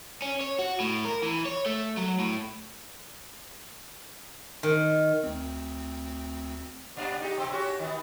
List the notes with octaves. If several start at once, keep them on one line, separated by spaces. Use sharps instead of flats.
C#4
C#5
F#4
A2
A#4
E3
C#5
A3
F#3
A2
D#3
D2 C4
G2 A#2 D4
D#4 G4
B2 C4
C#4 F#4 G4
D#3 B3